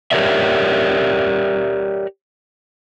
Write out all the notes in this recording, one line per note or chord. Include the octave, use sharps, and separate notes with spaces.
G4 A#4 C#5 D5 E5